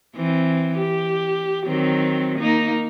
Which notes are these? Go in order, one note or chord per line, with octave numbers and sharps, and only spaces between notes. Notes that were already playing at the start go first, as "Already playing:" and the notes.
E3 C4
G4
D#3 F#3 C4
A#3 D#4